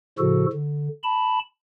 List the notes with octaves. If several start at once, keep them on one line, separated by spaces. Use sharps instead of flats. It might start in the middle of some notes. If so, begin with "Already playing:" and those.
A2 C#3 F3 F#4 A4
D3
A5 B5